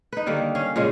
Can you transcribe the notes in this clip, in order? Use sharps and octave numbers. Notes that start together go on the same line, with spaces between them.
D#4 B4
D3 D#3 G3 A#3
C#4 F5
A#2 C#3 G#3 C#4